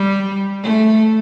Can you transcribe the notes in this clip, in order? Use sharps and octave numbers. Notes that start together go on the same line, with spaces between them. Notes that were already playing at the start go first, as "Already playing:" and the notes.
Already playing: G3
A3